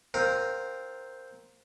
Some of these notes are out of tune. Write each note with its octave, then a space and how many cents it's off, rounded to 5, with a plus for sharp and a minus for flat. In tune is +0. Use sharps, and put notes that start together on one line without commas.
C4 +0 F4 +25 A#4 +0